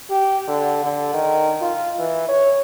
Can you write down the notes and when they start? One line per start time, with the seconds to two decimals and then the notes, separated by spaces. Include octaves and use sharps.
0.10 G4
0.48 D3
0.84 D3
1.14 D#3
1.62 F4
1.99 E3
2.28 C#5